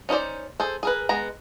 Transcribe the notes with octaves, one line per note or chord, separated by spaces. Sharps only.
C#4 D#4 G#4 C5 D5
G#4 A4 C5
G#4 A#4 B4
G#3 B3 A#5